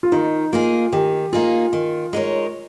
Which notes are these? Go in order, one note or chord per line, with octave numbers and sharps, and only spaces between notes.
F4
D#3 D#4
A#3 D#4 F4 G#4
D#3 G4
A#3 D#4 F4 G#4
D#3
G#3 D#4 A#4 C#5